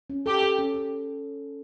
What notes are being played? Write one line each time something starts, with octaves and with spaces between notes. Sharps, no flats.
C#4
G4 A4
A4
C#4
A4